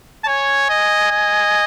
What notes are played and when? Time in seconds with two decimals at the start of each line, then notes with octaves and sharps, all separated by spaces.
0.24 A5
0.27 C#5 G#5
0.69 D#5
1.11 D#5